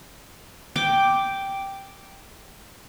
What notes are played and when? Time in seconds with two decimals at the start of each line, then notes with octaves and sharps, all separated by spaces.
0.76 G5 D6